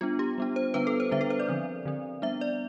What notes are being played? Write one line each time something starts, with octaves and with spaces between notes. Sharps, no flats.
G3 B3 D4 F4
G4
G3 B3 D4
C5
D3 G3 B3 D4 B4
A4
C5
D3 G3 B3 D4 E5
A4
C5
D5
D3 F3 C4
D3 F3 C4
G3 B3 D4 E5
D5